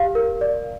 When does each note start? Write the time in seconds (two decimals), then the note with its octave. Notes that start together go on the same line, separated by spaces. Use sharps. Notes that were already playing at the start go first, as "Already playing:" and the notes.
Already playing: G4 F5
0.15 A#4
0.41 D5